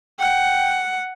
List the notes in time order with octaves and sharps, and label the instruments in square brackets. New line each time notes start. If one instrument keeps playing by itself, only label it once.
[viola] F#5 [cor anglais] G5